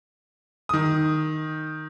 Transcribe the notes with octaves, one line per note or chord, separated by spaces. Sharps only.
D#3 D#6